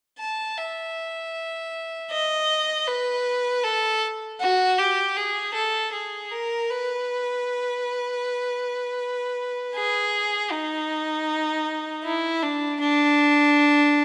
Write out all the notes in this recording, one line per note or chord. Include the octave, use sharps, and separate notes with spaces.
A5
E5
D#5
B4
A4
F#4
G4
G#4
A4
G#4
A#4
B4
G#4
D#4
E4
D4
D4